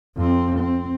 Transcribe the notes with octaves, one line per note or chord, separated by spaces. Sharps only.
F2 C4
C4